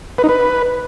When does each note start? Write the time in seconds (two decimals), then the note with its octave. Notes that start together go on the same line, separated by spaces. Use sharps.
0.18 B4
0.24 D#4
0.29 B4